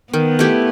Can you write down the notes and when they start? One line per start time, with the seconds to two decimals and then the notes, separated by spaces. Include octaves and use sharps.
0.13 D#3 B3
0.39 A3 E4 G4